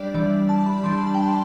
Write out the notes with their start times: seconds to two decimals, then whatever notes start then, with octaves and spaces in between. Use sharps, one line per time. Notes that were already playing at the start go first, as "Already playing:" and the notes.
Already playing: G3 D4 G4 D5
0.14 E3 G3 D4 D5
0.49 A5
0.66 B5
0.84 E3 G3 D4 C6
1.07 A5
1.14 G5
1.22 A5